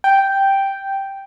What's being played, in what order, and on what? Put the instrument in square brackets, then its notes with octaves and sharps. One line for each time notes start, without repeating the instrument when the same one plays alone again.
[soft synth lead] G5